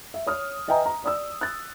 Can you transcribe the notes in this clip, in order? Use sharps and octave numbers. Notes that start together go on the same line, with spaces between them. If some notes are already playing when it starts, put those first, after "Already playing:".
E5
C#5 D#6 F6
B4 D#5 E5 G5 G#5 A#5
A#5
D5 D#6 E6
F#6 A6